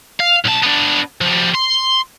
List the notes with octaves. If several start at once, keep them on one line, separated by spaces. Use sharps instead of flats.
F5
B1 A5
B3 D4
F3 G3
C6